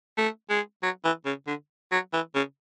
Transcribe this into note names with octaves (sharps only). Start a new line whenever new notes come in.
A3
G#3
F#3
E3
C#3
D3
F#3
E3
C#3